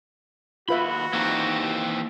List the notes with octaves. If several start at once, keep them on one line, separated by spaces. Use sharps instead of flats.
D#2 F4 F#4 B4 E5 B5
E3 A#3 C4 D#4